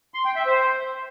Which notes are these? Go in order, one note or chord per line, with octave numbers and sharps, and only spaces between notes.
C6
G5
E5
C5